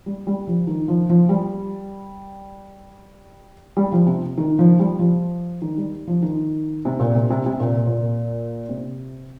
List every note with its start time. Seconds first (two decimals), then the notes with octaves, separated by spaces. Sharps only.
0.06 G3
0.27 G3
0.47 F3
0.67 D#3
0.88 F3
1.09 F3
1.29 G3
3.77 G3
3.92 F3
4.06 C3
4.37 D#3
4.59 F3
4.79 G3
4.99 F3
5.62 D#3
5.77 G3
6.07 F3
6.22 D#3
6.85 C3
7.00 A#2
7.15 C3
7.30 C3
7.46 C3
7.60 A#2
7.86 A#2
8.69 C3